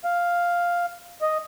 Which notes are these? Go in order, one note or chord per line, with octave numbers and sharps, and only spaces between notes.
F5
D#5